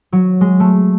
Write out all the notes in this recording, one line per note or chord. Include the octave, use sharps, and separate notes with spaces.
F#3
G#3
A3